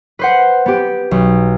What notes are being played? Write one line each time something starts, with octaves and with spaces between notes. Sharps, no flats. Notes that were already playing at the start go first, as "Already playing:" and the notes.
B4 C5 F#5
B3 G4
B1